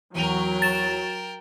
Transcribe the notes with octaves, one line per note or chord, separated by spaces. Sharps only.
E2 F#3 A#4 G5 D#7 F7
A6 E7